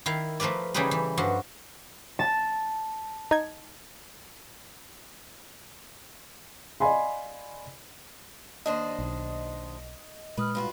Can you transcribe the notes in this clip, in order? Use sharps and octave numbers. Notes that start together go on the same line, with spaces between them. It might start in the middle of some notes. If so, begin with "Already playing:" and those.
D#3 E4 F5
F3 A3 A#4 B4 D5
C#3 E3 G3 D#4 G4 B4
E3
G2 F3 F#4
A5
D#4 G#6
D5 D#5 F5 G#5 B5 C6
D#2 D4 C5 D#5 A5 D#6
B1
A#2 G#3 B4 B5 D#6 F6
G2 F4 F#4 B4 B5